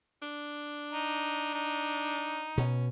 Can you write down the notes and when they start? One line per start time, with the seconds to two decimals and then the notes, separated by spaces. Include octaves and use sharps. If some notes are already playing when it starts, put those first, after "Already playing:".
0.22 D4
0.93 D#4
1.54 D#4
2.58 B2 C#4